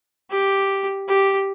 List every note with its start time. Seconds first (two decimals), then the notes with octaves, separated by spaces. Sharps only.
0.31 G4
1.09 G4